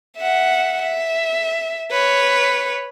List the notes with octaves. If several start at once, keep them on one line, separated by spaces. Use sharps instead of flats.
E5 F#5
E5
B4 C#5